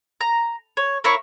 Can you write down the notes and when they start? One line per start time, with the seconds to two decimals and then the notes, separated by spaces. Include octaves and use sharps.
0.21 A#5
0.77 C#5
1.04 A#3 E4 C#5 C#6